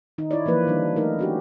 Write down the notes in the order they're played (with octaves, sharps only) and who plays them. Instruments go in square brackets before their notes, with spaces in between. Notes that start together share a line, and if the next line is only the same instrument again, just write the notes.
[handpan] D#3 D#4
E4 C#5 D5
E3 F3 A#3 B4
D#3 G3 D4
A3 D#4 A#4
C#4 F#4 G4